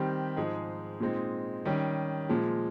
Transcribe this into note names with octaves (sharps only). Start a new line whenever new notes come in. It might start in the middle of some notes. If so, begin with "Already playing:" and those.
Already playing: D#3 G3 C4 G4
G#2 F3 G#3 D#4 G#4
A#2 G#3 C4 D#4
D#3 G3 C#4
A#2 F3 G#3